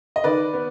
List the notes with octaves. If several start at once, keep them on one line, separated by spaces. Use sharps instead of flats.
D#5
D#3 B4 D5
B3